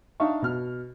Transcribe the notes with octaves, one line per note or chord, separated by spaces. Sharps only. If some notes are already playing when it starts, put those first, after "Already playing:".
D4 D#4 E5 F5 C#6
B2 F6